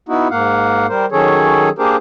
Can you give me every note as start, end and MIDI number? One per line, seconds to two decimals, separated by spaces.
0.09 0.28 59
0.09 0.28 63
0.09 0.28 64
0.09 0.28 66
0.31 0.87 44
0.31 0.87 58
0.31 0.87 77
0.31 0.87 78
0.89 1.06 55
0.89 1.06 70
0.89 1.06 72
1.12 1.69 51
1.12 1.69 54
1.12 1.69 61
1.12 1.69 68
1.12 1.69 69
1.12 1.69 73
1.79 1.96 58
1.79 1.96 62
1.79 1.96 67
1.79 1.96 68
1.79 1.96 70
1.79 1.96 72